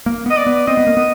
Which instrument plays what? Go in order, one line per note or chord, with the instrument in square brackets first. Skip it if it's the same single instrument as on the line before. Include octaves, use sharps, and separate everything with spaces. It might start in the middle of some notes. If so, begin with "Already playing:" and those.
[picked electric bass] A#3
[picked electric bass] B3 [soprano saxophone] D#5
[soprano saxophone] D5
[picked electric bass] B3
[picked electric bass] C4 [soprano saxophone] D#5
[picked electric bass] B3
A#3
B3